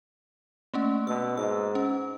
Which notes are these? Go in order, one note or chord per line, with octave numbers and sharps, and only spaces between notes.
A3 A#3 C#4
B2 E6
G#2 E6
C#4